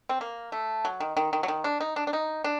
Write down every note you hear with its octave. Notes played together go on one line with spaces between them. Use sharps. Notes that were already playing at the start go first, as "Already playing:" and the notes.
C4
A#3
A3
F#3
D#3
D#3
D#3
F#3
D#3
D4
D#4
D4
D4
D#4
D4